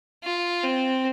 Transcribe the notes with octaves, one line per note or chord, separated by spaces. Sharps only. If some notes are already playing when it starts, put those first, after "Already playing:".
F4
C4